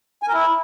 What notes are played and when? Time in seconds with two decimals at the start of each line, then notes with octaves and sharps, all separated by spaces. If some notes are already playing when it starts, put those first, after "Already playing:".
0.23 G#5
0.28 A#4
0.33 E4